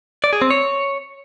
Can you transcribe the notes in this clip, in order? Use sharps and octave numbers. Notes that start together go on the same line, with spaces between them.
D5
G#4
C4
C#5